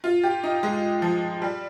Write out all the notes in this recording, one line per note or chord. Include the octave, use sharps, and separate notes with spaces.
F4
G4
D#4
G#3
F3
G3